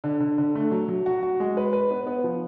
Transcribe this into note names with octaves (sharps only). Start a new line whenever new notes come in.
D3
D3
D3
A3
F#3
F#3
F#4
F#4
G#3
B4
B4
B3
B3
F3